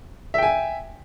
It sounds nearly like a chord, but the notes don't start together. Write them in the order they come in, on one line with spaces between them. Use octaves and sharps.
E5 G5 G#5